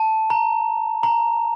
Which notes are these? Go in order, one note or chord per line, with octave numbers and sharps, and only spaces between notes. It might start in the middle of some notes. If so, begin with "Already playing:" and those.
Already playing: A5
A#5
A#5